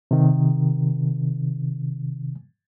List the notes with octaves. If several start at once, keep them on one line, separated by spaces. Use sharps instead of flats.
C3 D#3